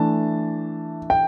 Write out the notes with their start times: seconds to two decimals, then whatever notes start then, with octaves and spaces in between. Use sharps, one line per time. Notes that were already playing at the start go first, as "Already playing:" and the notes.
Already playing: E3 A3 D4 A5
1.10 G5